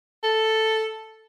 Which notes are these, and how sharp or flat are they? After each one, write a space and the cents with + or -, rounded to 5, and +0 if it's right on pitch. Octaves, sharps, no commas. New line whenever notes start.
A4 +0